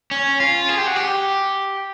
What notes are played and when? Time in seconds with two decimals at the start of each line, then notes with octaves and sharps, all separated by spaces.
0.11 C#4
0.40 F4
0.69 G#4
0.78 G4
0.87 F#4
0.96 G4